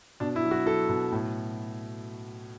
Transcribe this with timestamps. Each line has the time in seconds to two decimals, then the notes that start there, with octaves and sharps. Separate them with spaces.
0.20 B2 D4
0.36 E4
0.43 F#3
0.51 F#4
0.66 F#3 A4
0.89 B2
1.12 A2